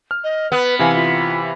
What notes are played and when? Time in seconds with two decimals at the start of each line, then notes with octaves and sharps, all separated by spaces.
0.11 F6
0.24 D#5
0.52 B3 B4
0.79 C3 E3 F5 G#5
0.96 F4